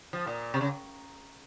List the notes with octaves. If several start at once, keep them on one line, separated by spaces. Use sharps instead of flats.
F3
A#2
C3
C#3